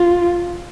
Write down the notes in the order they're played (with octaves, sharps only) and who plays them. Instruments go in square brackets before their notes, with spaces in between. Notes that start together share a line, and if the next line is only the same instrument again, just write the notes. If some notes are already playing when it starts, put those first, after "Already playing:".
Already playing: [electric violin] F4